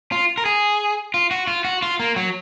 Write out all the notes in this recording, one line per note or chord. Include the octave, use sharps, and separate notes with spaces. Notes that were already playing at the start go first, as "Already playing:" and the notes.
F4
A#4
G#4
F4
F#4
F4
F#4
F4
A#3
F#3